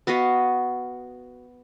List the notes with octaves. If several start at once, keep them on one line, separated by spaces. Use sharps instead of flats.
B3 F#4 D#5 F5